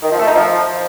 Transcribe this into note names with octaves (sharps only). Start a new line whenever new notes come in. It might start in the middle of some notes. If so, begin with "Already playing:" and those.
D#3
F3
A3
D#4
F3